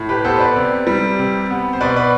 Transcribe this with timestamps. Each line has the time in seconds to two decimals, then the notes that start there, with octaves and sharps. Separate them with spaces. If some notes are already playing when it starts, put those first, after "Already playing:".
Already playing: A2
0.09 G4 B4
0.24 B3 A4 C5
0.36 C5
0.40 B4 D5
0.56 C3
0.87 G3
1.19 C3
1.50 B3
1.73 C5
1.81 B2 B4 D5
1.96 B4 D5